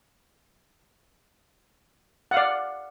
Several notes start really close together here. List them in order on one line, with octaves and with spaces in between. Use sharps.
F#5 F5 D5